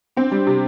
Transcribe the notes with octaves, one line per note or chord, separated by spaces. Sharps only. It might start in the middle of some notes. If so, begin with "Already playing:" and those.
C4 D4
G3
C3